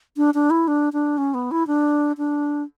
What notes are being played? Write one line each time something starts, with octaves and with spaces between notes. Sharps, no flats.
D4
D4
E4
D4
D4
C#4
B3
E4
D4
D4